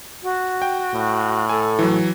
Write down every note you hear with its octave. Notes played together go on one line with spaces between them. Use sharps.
F#4
G5
A2
A4 G#5
E3 F#3